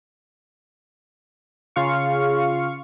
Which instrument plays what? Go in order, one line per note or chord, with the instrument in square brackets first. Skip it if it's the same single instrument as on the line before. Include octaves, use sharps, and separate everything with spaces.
[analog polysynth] C#3 F4 F5 C#6